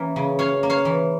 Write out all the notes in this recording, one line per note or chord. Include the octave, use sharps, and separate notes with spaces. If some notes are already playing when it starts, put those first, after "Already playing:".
Already playing: E3 A#3 C#4
C#3
C#4 C#5 F5
A#3
C#5 F5
E3